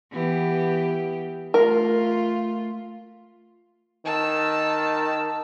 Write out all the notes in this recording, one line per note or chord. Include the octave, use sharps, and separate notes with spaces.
E3 B3 G4
A3 F4 A#4
D#3 A5 E6